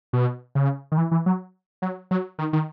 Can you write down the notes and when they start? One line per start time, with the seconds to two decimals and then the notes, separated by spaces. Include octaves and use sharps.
0.13 B2
0.55 C#3
0.92 D#3
0.98 E3
1.11 E3
1.26 F#3
1.82 F#3
2.11 F#3
2.39 D#3
2.53 D#3